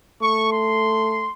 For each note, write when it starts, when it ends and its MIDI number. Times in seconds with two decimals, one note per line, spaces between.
0.22 1.27 57
0.22 0.52 85
0.52 1.32 84